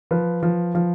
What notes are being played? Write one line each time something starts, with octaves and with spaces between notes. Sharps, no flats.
F3 B4
F3
F3